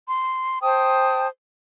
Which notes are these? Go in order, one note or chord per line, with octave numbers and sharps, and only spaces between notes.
C6
C5 G5 A5 D#6